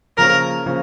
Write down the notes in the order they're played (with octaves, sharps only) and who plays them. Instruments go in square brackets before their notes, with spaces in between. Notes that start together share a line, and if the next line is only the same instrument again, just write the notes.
[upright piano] C#3 F3 A#3 C#4 [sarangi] A#4
[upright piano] C#3 F3 A#3 C#4